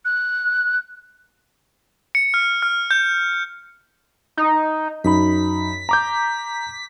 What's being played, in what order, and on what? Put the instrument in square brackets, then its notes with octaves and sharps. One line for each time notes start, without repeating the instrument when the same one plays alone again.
[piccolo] F#6
[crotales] C#7
F6
F6
G6
[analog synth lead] D#4
[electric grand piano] F#2 D#4 B5 [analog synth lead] B6
[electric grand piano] A#5 D6 G6